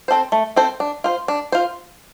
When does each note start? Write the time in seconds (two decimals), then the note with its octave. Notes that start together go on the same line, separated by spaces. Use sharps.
0.08 C4 A4 C5
0.32 A3
0.56 C4 A4 C5
0.80 D4
1.04 F4 C5
1.28 D4
1.52 F4 C5